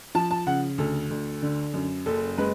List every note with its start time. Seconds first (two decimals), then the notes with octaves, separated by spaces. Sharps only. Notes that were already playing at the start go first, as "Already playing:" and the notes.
0.15 F3 A5
0.31 A5
0.46 C#3 F#5
0.78 D2 A4
1.11 D2
1.42 D3
1.74 F#2
2.06 F#1 A4
2.38 G#3 B4